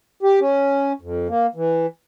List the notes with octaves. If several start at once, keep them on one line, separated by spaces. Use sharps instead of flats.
G4
C#4
F2
A#3
E3